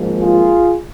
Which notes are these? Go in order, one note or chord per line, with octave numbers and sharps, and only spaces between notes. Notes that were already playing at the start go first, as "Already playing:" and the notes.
Already playing: G#1 G#2 F3 A#3
F4 G#4